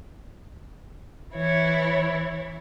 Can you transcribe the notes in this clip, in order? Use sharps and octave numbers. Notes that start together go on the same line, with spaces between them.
E3 E4 C#5